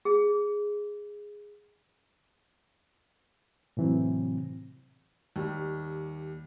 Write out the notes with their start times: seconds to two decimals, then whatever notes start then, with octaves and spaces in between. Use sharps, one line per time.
0.05 G#4
3.77 A2 C3 E3 F#3 C4
5.36 D#2 G3